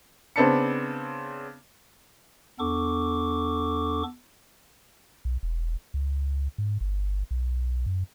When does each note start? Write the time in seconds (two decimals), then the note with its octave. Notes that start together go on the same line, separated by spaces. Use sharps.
0.36 C#3 B3 C4 D4 A5 C#7
2.59 E2 B3 D4 A4 C#6 D6
5.25 B1
5.43 E1
5.94 C#2
6.58 G#2
6.81 G1
7.31 B1
7.86 F#2